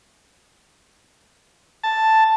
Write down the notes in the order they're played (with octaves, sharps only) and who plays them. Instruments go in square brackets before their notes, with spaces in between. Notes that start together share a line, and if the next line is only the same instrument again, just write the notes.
[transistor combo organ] A5